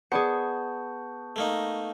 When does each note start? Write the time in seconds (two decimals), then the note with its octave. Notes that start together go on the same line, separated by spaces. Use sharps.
0.12 B3 G#4 D5 A5 C#6 G6 C#7
1.36 A3 A#3 D#4